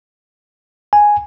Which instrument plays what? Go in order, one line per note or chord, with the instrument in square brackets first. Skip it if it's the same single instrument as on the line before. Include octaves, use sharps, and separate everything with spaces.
[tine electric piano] G#5